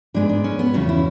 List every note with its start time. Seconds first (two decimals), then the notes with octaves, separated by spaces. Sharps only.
0.14 G#2 G#3 B3 D4
0.29 D4
0.44 C#4
0.59 B3
0.74 E2 C#3 F#3 C#4
0.89 E4